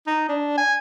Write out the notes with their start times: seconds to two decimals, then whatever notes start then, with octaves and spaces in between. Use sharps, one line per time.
0.07 D#4
0.29 D4
0.58 G#5